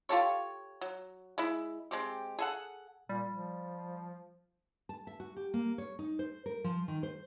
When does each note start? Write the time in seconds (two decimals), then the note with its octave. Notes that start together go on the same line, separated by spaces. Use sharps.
0.09 F4 G4 A4 C#5
0.81 F#3
1.38 G#3 E4
1.91 G#3 C4 G4
2.39 G#4 A4 F#5
3.09 A#2 G3
3.30 F3
4.89 A5
5.07 E5
5.20 F#4
5.37 G4
5.54 A#3
5.78 C#5
5.99 D#4
6.19 C5
6.46 A#4
6.64 F3
6.88 D#3
7.03 C5